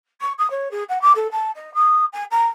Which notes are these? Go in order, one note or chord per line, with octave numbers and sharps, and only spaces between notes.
C#6
D#6
C#5
G#4
F#5
D6
A4
A5
D#5
D#6
G#5
A#5